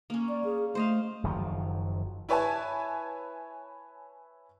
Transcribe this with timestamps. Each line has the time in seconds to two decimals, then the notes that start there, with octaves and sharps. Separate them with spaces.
0.10 A#3 C#4
0.28 D5
0.44 G#4
0.75 A3 C5 D#5 F5
1.24 F#1 D#3 F3 F#3
2.29 E4 B4 C#5 G#5 A5